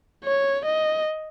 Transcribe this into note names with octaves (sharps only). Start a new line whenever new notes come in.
C#5
D#5